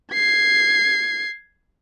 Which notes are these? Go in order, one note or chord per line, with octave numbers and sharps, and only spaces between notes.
G#6 C7